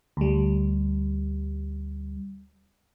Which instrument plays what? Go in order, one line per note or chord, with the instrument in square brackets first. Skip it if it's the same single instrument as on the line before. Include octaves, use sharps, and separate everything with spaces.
[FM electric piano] D2 G3